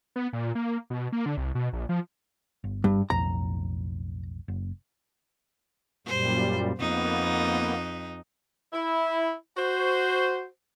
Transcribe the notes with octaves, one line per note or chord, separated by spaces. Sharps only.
B3
A#2
A#3
B2
A#3
D3
C2
B2
A#1
F3
G1
G2
B1 F2 A2 A#5
F#1
F#2 A#2 G3 C5
F2 A#3 B3 D#4
E4
F#4 C5